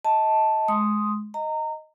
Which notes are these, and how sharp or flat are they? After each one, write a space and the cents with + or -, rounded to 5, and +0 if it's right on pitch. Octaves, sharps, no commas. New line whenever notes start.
D#5 +30 A5 +0
G#3 +25 C6 +0 D#6 +0
D#5 +0 A#5 -25